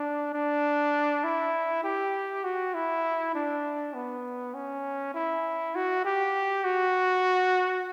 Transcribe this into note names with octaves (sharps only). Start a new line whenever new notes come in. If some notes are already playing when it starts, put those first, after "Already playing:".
Already playing: D4
D4
E4
G4
F#4
E4
D4
B3
C#4
E4
F#4
G4
F#4